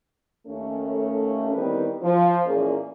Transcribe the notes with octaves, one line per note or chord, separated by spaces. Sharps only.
D#2 A3 C#4
D#3 E3 G3 B3 C4 B4
F3
E2 A#2 A#3 C#4 G#4 D5